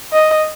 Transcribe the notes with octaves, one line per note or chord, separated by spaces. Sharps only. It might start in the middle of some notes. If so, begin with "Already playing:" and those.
D#5